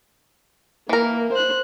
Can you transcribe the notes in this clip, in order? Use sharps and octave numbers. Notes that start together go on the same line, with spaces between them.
E3 A#3 A#4
C5 F#6